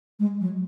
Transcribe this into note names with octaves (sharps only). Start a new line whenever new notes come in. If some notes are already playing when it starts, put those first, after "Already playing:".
G#3
F#3